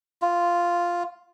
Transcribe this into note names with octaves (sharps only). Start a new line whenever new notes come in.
F4